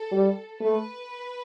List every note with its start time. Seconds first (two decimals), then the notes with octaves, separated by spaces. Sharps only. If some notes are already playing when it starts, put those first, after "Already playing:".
Already playing: A4
0.11 G3
0.60 A3 B4